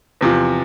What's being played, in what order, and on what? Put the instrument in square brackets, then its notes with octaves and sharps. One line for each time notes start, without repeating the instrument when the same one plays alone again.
[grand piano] E2 C3 F3